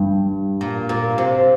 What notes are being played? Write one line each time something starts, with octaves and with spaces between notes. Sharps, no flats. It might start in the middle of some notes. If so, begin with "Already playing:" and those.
Already playing: G2
A#2
A#2
C3